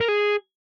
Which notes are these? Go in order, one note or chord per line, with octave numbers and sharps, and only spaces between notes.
A#4
G#4